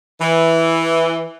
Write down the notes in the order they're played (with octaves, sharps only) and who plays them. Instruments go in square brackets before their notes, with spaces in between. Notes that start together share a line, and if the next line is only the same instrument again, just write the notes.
[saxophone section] E3